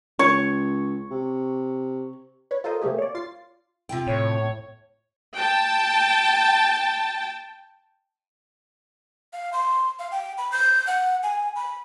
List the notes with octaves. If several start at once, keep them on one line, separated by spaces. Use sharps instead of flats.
C#2 C#5 C#6
C3
B4 C#5
F4 A4 A#4 C5 D#5
C3 A3 A#3 G4 G#4
C#5 D5
F4 A6 C7
C3 F4 G5
A2 C#5
G5 A5
F5
C6
F5
G5
B5
G6
F#5
G#5
B5